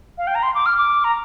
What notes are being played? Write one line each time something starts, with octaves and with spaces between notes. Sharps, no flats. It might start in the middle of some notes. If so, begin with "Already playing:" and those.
F5
G5
A#5
C6
D6
F6
D6
A#5